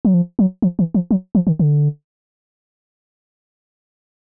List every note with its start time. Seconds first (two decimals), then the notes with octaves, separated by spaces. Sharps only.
0.05 F#3
0.14 F3
0.39 F#3
0.62 F3
0.79 E3
0.95 F3
1.11 F#3
1.35 F3
1.47 D#3
1.59 D3